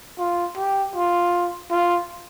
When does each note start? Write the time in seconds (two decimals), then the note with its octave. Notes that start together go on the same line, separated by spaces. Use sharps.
0.19 F4
0.57 G4
0.96 F4
1.71 F4